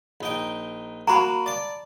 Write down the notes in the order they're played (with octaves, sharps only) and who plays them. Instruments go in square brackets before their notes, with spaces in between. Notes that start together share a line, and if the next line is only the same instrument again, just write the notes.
[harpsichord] A#1 D#4 G5
[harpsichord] A#3 F#4 F5 [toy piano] A#5 B5
[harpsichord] D5 A5